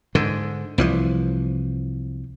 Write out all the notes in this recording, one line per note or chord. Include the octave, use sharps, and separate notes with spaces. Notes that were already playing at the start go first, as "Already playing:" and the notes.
G#2 D3
C2 E3 F3